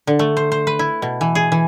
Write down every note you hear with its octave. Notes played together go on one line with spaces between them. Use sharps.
D3
A3
C5
C5
B4
E4
B2
E3
G#4
E3